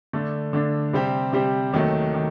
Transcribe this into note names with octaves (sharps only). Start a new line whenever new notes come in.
D3 A3 D4
D3 A3 D4
C3 G3 C4 G4 C5
C3 G3 C4 G4 C5
D#2 D#3 F#3 A3
D#3